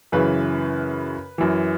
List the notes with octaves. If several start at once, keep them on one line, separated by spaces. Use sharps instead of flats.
F#2 C#3 E3 B4
F#2 E3